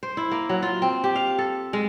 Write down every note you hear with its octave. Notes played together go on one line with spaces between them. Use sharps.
C5
E4
A#3
F#3
F4
C4
G4
F5
A4
G#3